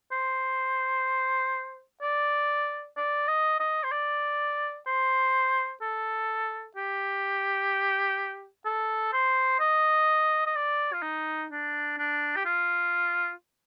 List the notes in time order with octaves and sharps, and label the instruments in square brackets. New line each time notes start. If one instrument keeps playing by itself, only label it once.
[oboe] C5
D5
D5
D#5
D#5
C5
D5
C5
A4
G4
A4
C5
D#5
D#5
D5
F4
D#4
D4
D4
G4
F4